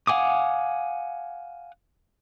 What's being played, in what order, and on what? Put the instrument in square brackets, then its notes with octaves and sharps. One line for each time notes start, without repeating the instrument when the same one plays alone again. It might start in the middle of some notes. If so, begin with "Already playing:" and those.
[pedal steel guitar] F5 F#5 G#5 D6 D#6